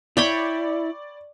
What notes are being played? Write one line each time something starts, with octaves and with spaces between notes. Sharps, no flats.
E4 C#5 D5 G5 B5